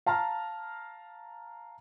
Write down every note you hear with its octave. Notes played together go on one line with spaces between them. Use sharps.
F5 A5 A#5 F6